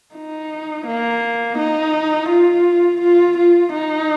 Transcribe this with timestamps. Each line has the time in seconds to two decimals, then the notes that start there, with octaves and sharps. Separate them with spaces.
0.15 D#4
0.87 A#3
1.58 D#4
2.29 F4
3.01 F4
3.37 F4
3.72 D#4